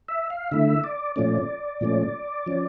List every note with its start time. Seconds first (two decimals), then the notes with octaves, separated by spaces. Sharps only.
0.08 E5
0.30 F5
0.51 D3 A3 E4 E5
0.84 D5
1.16 A#2 F3 A3 C#4 D5
1.81 A#2 F3 A3 C#4
2.46 F3 C#4